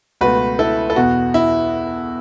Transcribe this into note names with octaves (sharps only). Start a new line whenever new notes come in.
C#2 B2 A3 F#4 B4
E4 A4
A4
E2 B2 B3 F#4
E4